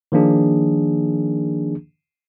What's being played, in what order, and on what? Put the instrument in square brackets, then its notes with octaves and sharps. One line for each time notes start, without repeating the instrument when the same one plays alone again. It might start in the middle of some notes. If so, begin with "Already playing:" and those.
[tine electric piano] D#3 F3 A#3 D4 G#4